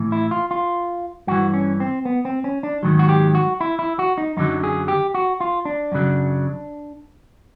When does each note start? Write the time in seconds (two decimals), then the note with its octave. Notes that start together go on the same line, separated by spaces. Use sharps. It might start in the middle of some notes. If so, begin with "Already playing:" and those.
Already playing: A2 E3
0.12 E4
0.31 F4
0.51 F4
1.27 G2 E3 F#4
1.54 C#4
1.80 C4
2.05 B3
2.25 C4
2.44 C#4
2.63 D4
2.83 G#2 D#3 F#3
2.99 F#4
3.09 G4
3.35 F#4
3.61 E4
3.79 E4
3.99 F#4
4.18 D#4
4.37 F#2 D3 F#3 D#4
4.63 G#4
4.88 G4
5.14 F#4
5.40 F4
5.65 D4
5.92 F#2 C#3 F#3